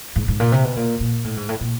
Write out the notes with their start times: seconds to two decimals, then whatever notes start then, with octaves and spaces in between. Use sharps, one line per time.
0.16 G#2
0.28 G#2
0.40 A#2
0.52 C3
0.64 B2
0.76 A#2
1.00 A#2
1.24 A2
1.37 G#2
1.49 A2
1.61 A#2